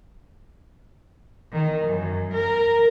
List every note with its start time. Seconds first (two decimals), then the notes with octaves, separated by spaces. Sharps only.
1.54 D#3
1.86 F#2
2.33 A#4